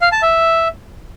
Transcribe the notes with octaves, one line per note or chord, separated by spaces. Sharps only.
F5
A5
E5